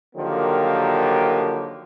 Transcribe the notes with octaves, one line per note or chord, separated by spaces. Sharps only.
D3 D#3 F3 F#3 A#3 G4